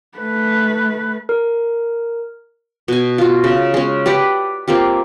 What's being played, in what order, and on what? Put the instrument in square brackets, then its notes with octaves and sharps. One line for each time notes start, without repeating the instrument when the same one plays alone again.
[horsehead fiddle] A3 B4
[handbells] A#4
[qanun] B2 G#5
F4 F#4
C#3
G#3 C#4
G4 B4 D5 F#5
A#3 C4 F4 G4